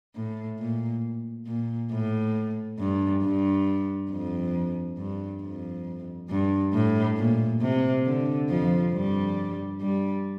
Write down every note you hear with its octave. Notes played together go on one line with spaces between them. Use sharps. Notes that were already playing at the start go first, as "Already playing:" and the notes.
A2
A#2
A#2
A2
G2
G2
F2
G2
F2
G2
A2
A#2
C3
D3
F2 F3
G2 G3
G2 G3